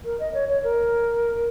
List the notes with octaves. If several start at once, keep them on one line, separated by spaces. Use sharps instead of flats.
A#4
D#5
C#5
C#5
A#4